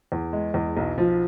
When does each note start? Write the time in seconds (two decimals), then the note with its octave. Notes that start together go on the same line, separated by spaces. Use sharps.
0.12 E2
0.33 G#3
0.54 E2
0.77 B1
0.98 F3